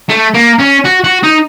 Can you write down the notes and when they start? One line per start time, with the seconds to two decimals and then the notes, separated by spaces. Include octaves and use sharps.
0.09 A3
0.34 A#3
0.60 C#4
0.85 F#4
1.04 F#4
1.23 D#4